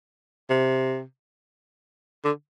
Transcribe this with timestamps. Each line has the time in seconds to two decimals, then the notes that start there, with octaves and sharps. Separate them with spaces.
0.50 C3
2.25 D3